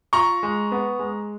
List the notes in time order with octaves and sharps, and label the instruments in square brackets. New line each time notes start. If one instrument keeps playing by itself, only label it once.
[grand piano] F4 A#5 C#6
G#3
B3
G#3